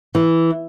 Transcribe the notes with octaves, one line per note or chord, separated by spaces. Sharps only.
E3